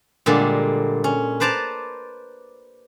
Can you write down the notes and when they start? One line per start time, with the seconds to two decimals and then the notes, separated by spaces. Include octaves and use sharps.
0.26 A#2 D3 G3 G#3
1.04 C#4
1.40 B4 C5 D5 A5 A#5